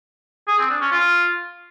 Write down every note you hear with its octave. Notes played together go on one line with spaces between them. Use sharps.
G#4
C4
D4
C#4
F4